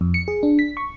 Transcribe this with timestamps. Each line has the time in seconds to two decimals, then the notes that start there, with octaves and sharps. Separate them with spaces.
0.01 F2
0.14 C#7
0.28 G#4
0.43 D4
0.59 B6
0.77 C#6